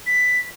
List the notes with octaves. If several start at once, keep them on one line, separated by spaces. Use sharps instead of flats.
B6